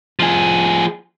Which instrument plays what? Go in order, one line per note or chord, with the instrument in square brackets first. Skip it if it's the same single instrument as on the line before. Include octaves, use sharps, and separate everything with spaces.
[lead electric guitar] F3 G#4